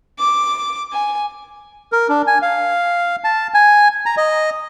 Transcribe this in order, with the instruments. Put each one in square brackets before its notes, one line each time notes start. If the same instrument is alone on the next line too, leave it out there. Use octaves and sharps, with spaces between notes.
[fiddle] D6
G#5
[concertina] A#4
D4
G#5
F5
A5
G#5
A#5
D#5